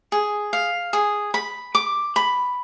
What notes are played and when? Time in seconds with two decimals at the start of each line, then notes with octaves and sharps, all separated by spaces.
0.12 G#4
0.53 F5
0.93 G#4
1.34 B5
1.75 D6
2.16 B5